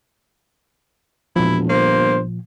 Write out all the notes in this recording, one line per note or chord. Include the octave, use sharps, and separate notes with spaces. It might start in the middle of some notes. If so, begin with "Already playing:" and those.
E1 A#2 F3 E4
G1 A#3 C5